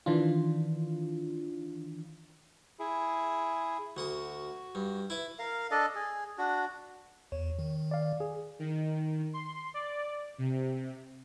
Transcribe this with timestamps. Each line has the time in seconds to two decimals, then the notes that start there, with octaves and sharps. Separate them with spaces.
0.06 D#3 E3 D4 F4
2.79 E4 G#4
3.97 D2 F#4 F#5 D#6
4.75 G2
5.10 E4 B4
5.39 A#4 F5
5.71 D4 A4 D5 D#5
5.95 G#4
6.38 D4 F#4
7.32 E2 C#5
7.59 D#3
7.91 D5 F5
8.20 G#4
8.59 D#3
9.33 C6
9.74 D5
10.38 C3